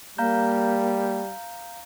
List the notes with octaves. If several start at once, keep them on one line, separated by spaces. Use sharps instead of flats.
G3 A#3 F5 A#5 G6